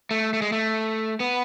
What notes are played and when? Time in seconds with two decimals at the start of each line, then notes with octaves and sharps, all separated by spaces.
0.11 A3
0.33 A3
0.42 G#3
0.52 A3
1.20 B3